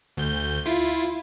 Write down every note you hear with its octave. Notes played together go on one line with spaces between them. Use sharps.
D2 G6
E4 F4